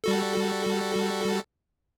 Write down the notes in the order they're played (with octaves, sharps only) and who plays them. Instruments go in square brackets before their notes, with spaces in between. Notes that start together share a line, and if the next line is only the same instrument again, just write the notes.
[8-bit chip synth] G3 F#4 A4